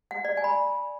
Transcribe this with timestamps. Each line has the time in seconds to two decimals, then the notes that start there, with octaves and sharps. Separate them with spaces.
0.11 F#5
0.25 D5
0.37 G#5
0.44 B5